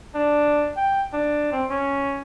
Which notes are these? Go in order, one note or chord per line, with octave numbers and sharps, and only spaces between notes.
D4
G5
D4
C4
C#4